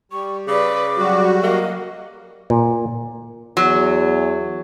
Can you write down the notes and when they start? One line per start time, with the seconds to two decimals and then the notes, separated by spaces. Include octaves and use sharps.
0.12 G3 C#6
0.47 C#3 B4 D5 D6
0.98 F#3 G3 F#4
1.43 A#3 D#5
2.50 A#2
3.57 E2 F#3